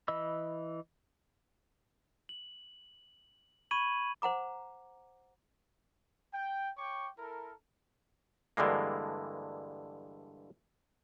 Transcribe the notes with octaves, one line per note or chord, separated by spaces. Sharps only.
E3 D#5 B5 E6
F#7
B5 C#6 G#6 D#7 F#7
C5 F#5 A#5 D6
G5
C#5 G5 C#6 D6
E4 A4 A#4
G2 D3 E3 G#3 A#3